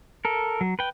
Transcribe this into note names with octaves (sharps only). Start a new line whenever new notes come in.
A4 A#4
F#3
B4 G5